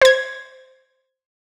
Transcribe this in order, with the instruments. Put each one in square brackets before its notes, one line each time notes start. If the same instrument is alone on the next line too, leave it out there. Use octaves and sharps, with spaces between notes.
[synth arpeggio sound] C5 G#6